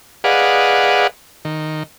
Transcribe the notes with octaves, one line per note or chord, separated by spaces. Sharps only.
G#4 B4 D5 D#5 F5 F#5
D#3